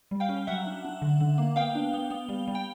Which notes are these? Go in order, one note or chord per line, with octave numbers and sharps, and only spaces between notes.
G3
F5 G5
C#4
F#3 E5 F#5
D4
D4
D3
D3
A#3
B3 F5 G5
D4
B3
B3
G3
G3
G5